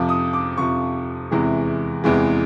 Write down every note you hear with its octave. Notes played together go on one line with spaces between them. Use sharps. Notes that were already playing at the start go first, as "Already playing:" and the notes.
Already playing: F2 C3 F3 D6
D#6
D6
F2 C3 F3 C#6
E2 C3 E3 G#3
E2 C3 E3 G#3